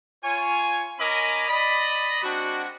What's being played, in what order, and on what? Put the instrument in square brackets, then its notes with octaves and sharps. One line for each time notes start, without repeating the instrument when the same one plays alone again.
[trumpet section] F4 C#5 G#5
C#4 A#4 D#5 G#5 B5 D6
D5 D#5 B5
G#3 C4 D4 F#4